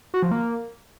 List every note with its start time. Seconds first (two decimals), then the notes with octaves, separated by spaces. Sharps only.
0.14 F#4
0.23 F3
0.31 A#3